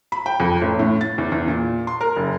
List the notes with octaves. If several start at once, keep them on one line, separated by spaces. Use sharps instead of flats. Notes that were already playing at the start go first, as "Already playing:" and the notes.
B5
G5
F2
A1
A2
A6
E2
E2
A#2
C6
A#4
F#1